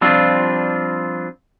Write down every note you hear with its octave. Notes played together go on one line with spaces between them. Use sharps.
F3 G3 C4 D4 F4